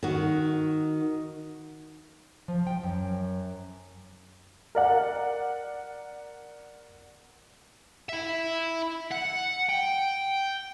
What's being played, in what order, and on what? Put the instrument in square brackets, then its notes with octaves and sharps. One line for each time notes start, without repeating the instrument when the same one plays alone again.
[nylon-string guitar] D#3 F#4
F3
G5
F#2
[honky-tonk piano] A#4 D5 F#5
[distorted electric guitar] E4 E5
F#5
G5